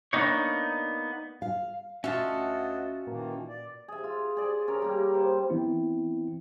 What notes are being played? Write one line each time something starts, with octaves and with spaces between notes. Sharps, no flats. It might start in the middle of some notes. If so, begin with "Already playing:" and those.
A#3 B3 D4 D#4 C#5
F5
D2 C#4 F4 F#4 D#5 E5 F#5 A5
A#2 D#3 E3 A#3
D5
G#4 E5
F4
G#4 D5
C#4 A#4
G3 A#3
C5
E3 B3 C4 E4